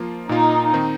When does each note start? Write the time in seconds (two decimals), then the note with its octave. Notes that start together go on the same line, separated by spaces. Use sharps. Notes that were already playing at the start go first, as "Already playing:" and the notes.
Already playing: F3 A#3 F4
0.29 A#2 A#3 D#4 F4
0.73 D#3 C4 D#4